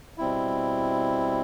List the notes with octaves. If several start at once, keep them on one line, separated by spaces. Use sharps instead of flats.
B2 G3 C4 E4